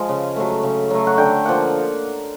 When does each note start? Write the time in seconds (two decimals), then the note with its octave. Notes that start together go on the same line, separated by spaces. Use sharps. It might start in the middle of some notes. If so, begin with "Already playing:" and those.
Already playing: F3 G#3 F5 G#5
0.09 C#3
0.36 F#3 A3
0.63 C#3
0.91 F#3 A3
1.07 F#5
1.18 D3 G5
1.45 F3 A#3 F#5